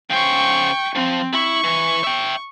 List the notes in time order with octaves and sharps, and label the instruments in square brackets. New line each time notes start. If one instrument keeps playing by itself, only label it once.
[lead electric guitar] C#3 C5 [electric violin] G5 C#6
[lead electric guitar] F3 [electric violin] C4
[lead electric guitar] E4 [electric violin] C#6
[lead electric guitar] E3
E5 G5